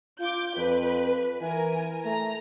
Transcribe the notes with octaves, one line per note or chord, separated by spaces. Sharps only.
F4 D6 G6
F2 B4
E3 A#4 G#5
A3 A#5